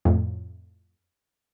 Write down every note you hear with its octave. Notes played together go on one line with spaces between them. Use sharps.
F2 A2